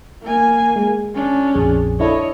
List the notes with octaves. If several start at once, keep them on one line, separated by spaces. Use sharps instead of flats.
A#3 G#5
G#3
C#4 D4
A#1 F2 G#4
D4 E4 A4 C#5 D#5